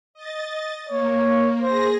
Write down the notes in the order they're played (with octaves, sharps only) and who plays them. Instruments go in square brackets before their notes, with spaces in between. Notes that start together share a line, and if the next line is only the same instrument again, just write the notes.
[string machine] D#5 A6
[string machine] A#3 [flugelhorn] C#5
[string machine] G#4 A#6 [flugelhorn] C5